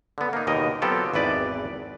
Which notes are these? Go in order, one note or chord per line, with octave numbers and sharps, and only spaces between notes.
D3 B3
A#3 D#4
D#2 B2 A#4 D#5
F#3 B3 C4 F4 G4 A4
G#1 E2 B4 D5